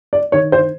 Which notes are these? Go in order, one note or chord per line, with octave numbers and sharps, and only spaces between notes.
D5
D#3 C#5
C5